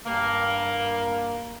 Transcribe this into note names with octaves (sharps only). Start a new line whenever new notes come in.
G2 A#3